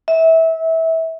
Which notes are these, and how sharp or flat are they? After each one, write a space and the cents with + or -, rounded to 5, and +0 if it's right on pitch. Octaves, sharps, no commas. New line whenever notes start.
E5 -25